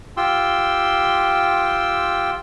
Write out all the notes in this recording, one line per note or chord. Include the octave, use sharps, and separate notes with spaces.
F4 G4 G5 C6 E6